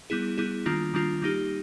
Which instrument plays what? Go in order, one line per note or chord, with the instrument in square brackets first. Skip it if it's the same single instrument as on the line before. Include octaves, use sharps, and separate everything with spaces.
[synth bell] G3 B3 E4 G#4
G3 B3 E4 G#4
D#3 G3 A#3 D4 F4
D#3 G3 A#3 D4 F4
G3 A#3 D#4 G4